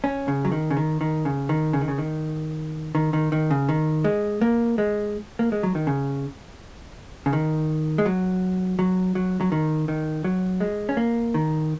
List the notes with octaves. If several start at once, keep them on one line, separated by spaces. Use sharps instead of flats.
C#4
C#3
F#3
D#3
C#3
D#3
D#3
C#3
D#3
C#3
D#3
C#3
D#3
D#3
D#3
D#3
C#3
D#3
G#3
A#3
G#3
A#3
G#3
F#3
D#3
C#3
C#3
D#3
G#3
F#3
F#3
F#3
F#3
D#3
D#3
F#3
G#3
C#4
A#3
D#3